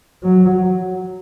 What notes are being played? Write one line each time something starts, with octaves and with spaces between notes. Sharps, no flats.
F#3